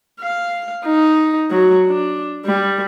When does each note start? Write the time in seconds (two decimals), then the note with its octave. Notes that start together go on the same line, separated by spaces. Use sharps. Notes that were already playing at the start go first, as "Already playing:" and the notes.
0.20 F5
0.85 D#4
1.51 F#3
1.87 D4
2.45 G3